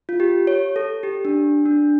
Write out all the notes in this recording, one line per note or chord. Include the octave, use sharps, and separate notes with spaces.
F4
G4
C#5
A4
G4
D4
D4